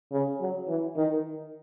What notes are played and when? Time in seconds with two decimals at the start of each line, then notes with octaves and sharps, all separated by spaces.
0.12 C#3
0.40 F#3
0.68 E3
0.96 D#3